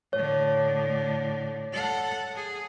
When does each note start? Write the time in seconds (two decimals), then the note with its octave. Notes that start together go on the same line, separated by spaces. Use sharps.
0.13 A2 D3 C#5
1.73 A4 F#5
2.36 G#4